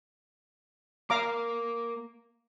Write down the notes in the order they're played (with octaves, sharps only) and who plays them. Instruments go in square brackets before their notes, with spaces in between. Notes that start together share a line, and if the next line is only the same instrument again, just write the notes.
[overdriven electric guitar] A#3 [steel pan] F5 A#5 D6